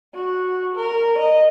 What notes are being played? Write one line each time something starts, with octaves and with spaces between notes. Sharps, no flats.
F#4
A#4
D#5